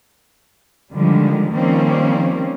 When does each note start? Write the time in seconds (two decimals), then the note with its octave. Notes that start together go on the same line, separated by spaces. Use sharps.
0.93 D3 D#3 F3 G3 G#3
1.51 D#3 F3 G3 A#3 C4 C#4